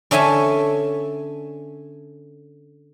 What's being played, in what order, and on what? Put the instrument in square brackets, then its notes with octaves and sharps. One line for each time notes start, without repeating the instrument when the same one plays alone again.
[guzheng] D3 C#4 A4 E5 G#5 A5